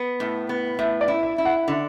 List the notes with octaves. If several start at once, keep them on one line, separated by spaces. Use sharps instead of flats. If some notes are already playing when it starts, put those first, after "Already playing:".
Already playing: B3
A2
B3
A2 E5
D5
E4
E5
E4
F#5
D3 E5